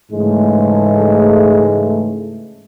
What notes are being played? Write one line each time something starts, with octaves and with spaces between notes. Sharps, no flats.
G#2 C#3 E3 G#3 A3